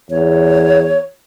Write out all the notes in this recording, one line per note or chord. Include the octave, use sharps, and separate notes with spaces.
E2 C#5